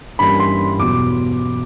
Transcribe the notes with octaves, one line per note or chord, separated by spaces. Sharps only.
G2 E3 G3 A#3 C#4 B5
C6
E2 B2 F#3 D6